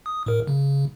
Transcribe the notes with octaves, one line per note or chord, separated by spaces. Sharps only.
D#6
A2 A#4
C#3